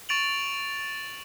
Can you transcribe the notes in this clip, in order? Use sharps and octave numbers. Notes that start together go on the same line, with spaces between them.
C#6 A6 D7 F7 F#7